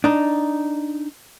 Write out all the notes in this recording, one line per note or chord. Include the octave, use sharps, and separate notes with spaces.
D4 D#4